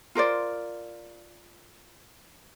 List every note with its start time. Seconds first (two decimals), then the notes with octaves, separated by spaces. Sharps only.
0.15 F4 A#4 C5 D5